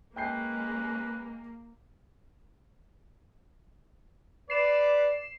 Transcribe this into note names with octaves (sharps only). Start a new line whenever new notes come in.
G#3 A#3 C#4 B4 G5 G6 C7
B4 D5 C7 E7